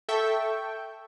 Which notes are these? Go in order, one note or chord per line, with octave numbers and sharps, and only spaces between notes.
A4 E5 G5 C#6